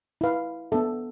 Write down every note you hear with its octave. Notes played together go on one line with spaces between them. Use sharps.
E4 B4 F5
B3 D4 A4 E5